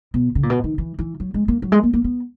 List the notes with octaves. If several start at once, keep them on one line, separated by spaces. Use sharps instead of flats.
B2
C#3
A#2
B2
D#3
E3
E3
F#3
G#3
A#3
F#3
G#3
A#3
A#3
B3